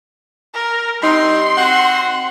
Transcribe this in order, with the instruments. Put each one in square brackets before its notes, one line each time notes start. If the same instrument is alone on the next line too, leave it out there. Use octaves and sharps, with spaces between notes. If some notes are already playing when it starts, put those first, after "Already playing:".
[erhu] A#4
[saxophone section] G3 C4 D#4 [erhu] C6
[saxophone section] C4 F#4 F#5